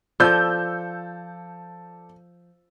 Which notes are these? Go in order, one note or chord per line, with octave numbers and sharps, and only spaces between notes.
F3 A4 D5 E6 G6